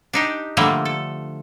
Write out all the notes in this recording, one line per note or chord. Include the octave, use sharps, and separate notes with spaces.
D4 D#4 G4
D3 F3 G3 A3 A#3
A4